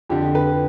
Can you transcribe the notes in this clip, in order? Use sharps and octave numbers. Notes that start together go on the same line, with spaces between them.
F2 D3 G4
B4